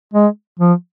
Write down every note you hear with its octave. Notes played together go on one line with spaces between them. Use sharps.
G#3
F3